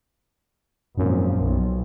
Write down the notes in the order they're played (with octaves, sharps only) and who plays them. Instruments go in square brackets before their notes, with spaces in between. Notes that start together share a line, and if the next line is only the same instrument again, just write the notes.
[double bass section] G#1 A#2 F3 [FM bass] F#2
[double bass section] B1